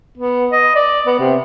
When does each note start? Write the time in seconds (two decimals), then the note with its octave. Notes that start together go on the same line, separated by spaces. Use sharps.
0.18 B3
0.52 D#5
0.75 D5
1.07 B3
1.20 C3